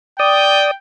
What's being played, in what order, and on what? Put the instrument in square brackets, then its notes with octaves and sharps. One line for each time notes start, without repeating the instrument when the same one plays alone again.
[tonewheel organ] D5 D#6 [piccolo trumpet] G5